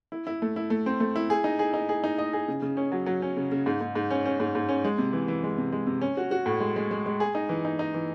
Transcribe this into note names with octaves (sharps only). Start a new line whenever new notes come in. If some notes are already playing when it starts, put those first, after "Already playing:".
E4
E4
A3
E4
A3
C4
A3
E4
G#4
D#4
G#4
D#4
G#4
D#4
D#5
G#4
C#3
C#3
C#4
F#3
F#3
C#4
C#3
C#3
G#2
G#2
G#2
C#4
C#4
G#2
G#2
C#4
G#3
C3
E3
E3
G#3
C3
G#3
C3
C#4
F#4
F#4
A2
G#3
G#3
G#3
G#3
G#4
D#4
E3
D#4
D#4
E3